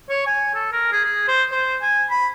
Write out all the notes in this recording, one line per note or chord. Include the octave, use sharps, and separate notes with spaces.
C#5
G#5
A4
A#4
G#4
G#4
C5
C5
G#5
B5